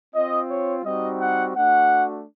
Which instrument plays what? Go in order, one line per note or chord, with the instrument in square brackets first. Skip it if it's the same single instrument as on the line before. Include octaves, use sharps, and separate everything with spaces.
[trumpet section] C4 F4 D#5
C#5
G3 C4 D#4 F#4 D#5
F#5
A3 D4 F#4 F#5